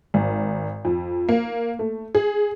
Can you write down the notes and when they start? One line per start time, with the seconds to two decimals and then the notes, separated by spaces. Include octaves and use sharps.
0.14 G#1
0.85 F2
1.29 A#3
1.79 A3
2.15 G#4